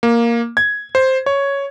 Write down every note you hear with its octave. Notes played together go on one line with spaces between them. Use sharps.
A#3
G#6
C5
C#5